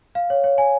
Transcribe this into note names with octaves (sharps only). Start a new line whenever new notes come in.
F5
C#5
C#5
G#5